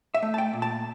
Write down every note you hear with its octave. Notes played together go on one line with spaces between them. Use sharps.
E5
A3
A5
G5
A#2
A5